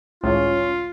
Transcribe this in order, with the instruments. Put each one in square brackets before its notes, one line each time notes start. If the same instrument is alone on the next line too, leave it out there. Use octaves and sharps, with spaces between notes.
[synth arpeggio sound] G#1 C#2 A2 [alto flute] C#4 [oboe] F4